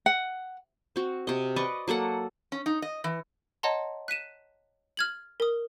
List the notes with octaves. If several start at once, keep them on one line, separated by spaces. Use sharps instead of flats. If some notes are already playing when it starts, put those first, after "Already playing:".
F#5
C4 F#4
C3 D#5
B4 D5 D#5 C#6
F#3 A#3 A4 F#5
C#4
D#4
D#5
E3
C#5 D#5 F#5 A5 A#5 C6
F#6 B6 D#7 E7
F6 G#6 F#7
A#4 D#6